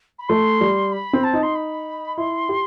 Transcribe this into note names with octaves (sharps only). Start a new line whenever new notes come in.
B5
A3 C6
G3
B5
C4
A5
D#4
C6
B5
E4 C6
G4